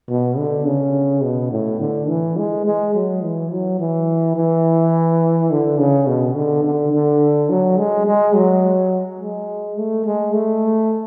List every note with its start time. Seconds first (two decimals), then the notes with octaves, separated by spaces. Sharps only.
0.09 B2
0.38 D3
0.66 C#3
1.23 B2
1.51 A2
1.80 D3
2.09 E3
2.37 G#3
2.66 G#3
2.94 F#3
3.23 E3
3.52 F#3
3.79 E3
4.36 E3
5.51 D3
5.79 C#3
6.07 B2
6.35 D3
6.64 D3
6.92 D3
7.50 F#3
7.78 G#3
8.07 G#3
8.36 F#3
9.20 G#3
9.78 A3
10.05 G#3
10.34 A3